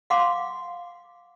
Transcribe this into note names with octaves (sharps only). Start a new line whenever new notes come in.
F5 F#5 C6 D6